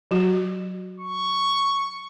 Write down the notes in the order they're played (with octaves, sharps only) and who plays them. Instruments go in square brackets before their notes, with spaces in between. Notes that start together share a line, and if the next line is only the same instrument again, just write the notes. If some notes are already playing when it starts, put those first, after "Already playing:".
[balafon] F#3 F#4
[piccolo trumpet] C#6